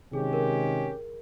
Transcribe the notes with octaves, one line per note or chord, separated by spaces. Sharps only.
C3 D#3 G#3 C#4 G4 G#4
A#4